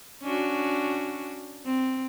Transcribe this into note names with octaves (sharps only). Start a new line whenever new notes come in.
C#4 D4 F#4
C4